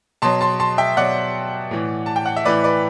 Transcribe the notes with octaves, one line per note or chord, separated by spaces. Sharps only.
B2 F#3 A5 C6
A5 C6
A5 C6
E5 G5
B2 F#3 D5 F#5
A2 E3
A5
G5
F#5
E5
A2 E3 B4 D5
B4 D5